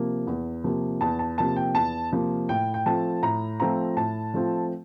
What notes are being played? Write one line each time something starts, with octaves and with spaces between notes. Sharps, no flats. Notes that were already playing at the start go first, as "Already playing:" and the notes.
Already playing: C3 F3 A#3
E2
C3 F3 A#3
E2 A5
A5
C3 F3 A#3 A5
G5
E2 A5
C3 F3 A#3
A2 G5
G5
F3 A3 C4 F4 A5
A2 A#5
F3 A3 C4 F4 A#5
A2 A5
F3 A3 C4 F4